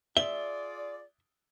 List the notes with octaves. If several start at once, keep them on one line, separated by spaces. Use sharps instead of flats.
F4 G#4 D5 E5 G7